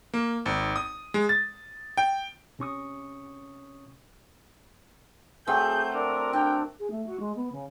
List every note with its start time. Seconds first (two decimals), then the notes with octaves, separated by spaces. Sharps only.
0.14 A#3
0.46 G#1
0.76 D#6
1.14 G#3
1.29 A6
1.97 G5
2.59 C3 C#4 C#6 D#6
5.47 F#3 A3 C4 G#4 G6
5.94 D4 A#4
6.33 D4 G5
6.79 G#4
6.91 A3
7.06 F#4
7.20 G#3
7.36 B3
7.52 C#3